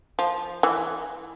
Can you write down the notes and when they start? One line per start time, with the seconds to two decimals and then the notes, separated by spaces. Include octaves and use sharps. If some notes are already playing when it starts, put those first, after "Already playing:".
0.19 F3
0.63 E3